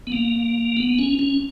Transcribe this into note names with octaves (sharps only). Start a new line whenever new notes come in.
B3
A#3
B3
C#4
C#4